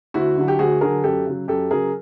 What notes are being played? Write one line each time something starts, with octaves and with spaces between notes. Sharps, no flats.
D2 E4 F#4
D3 F#3
G4
D2 F#4 G#4
D3 F#3 G#4 A#4
F#2 G4 A4
C#3 F#3
F#2 G4 A4
C#3 F#3 G#4 A#4